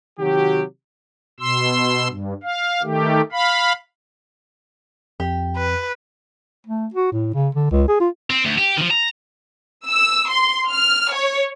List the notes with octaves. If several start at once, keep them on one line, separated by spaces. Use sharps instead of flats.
C3 D#3 F#3 F#4 G4
B2 C6 E6
G2
F5
D#3 A3 G4
F5 B5
F2 G4
B4
A3
F#4
A2
C#3
D3
C#2
G#4
F4
C4
D2
G4
D#3 F3
A#5
E6
C6
F6
C#5